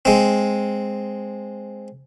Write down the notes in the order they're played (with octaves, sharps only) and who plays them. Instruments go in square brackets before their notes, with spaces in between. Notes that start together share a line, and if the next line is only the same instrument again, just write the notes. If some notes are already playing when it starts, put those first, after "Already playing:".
[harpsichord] G#3 C4